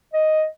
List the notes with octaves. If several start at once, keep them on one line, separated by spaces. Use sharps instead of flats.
D#5